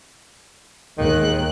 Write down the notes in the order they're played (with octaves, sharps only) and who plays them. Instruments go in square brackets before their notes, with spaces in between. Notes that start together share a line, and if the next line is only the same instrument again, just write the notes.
[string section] D#2 G#3 F#6 [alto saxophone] D#3